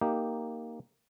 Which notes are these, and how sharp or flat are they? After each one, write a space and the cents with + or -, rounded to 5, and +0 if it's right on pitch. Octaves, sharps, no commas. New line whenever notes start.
A#3 +0 D#4 +0 G4 +0